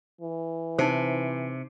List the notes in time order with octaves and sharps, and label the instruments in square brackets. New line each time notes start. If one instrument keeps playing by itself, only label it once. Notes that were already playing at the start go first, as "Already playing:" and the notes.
[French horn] E3
[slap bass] C3 [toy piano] D#4 C5